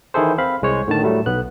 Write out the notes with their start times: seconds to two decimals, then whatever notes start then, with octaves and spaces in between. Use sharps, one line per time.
0.14 D#3 E3 E4 G#4 A4 C5
0.38 C4 F5 B5
0.62 C2 G#3 C5 C#5
0.88 A2 D3 D#3 A5
1.02 A2 F#3 G3 A3
1.26 B1 B3 F#6